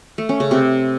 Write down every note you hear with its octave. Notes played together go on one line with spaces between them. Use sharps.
A3
C#4
C#3
C3